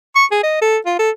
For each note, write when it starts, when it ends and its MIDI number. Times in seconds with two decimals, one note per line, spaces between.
0.16 0.25 85
0.31 0.43 68
0.44 0.58 75
0.62 0.78 69
0.86 0.96 65
0.99 1.11 69